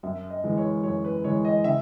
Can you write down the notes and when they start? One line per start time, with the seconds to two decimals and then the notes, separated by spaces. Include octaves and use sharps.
0.03 F#2 E5
0.30 D#5
0.44 E3 G#3
0.57 C#5
0.83 F#2 C#5
1.05 B4
1.24 E3 G#3 C#5
1.45 D#5
1.64 C#3 E5